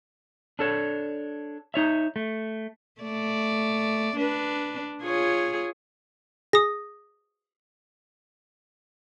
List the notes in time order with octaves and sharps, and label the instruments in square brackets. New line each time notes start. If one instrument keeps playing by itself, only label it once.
[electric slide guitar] D4 A4 C#5
D#4 C#5 E5
A3
[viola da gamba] A3 D5
D4 B4
F4 G#4 C#5
[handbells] G#4 [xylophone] D#6 A#6